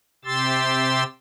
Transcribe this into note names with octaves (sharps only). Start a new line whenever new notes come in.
C3 G4 C6 E6 A6